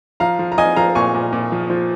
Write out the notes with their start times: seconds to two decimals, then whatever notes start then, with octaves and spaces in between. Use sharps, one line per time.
0.20 F3 F5 A#5
0.39 F3
0.52 A#5
0.58 F3 D#5 G#5
0.76 F3 F5 A#5
0.95 A#2 G#5 C#6
1.14 A#2
1.33 A#2
1.52 F3
1.70 F3